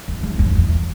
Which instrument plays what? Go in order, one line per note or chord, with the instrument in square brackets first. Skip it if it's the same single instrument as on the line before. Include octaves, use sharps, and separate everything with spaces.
[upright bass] E2
E2
F2
E2